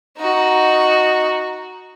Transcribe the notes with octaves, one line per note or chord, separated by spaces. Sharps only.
D#4 F#4